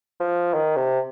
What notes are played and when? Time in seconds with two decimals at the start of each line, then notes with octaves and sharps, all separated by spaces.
0.20 F3
0.54 D#3
0.76 C3